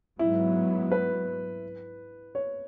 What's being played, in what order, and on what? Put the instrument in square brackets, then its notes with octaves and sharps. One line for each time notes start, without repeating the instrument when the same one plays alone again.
[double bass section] G#2 F#3 B3 [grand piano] E4
[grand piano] B4
C#5